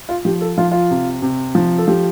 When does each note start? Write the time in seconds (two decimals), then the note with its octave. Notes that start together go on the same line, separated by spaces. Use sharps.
0.09 F4
0.25 F3 G4
0.41 A4
0.58 F3 F4
0.72 F4
0.91 C3
1.22 C3
1.55 F3
1.78 A4
1.88 F3 G4